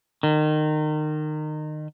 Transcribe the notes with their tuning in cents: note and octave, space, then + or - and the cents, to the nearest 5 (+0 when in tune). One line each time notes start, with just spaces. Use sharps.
D#3 -25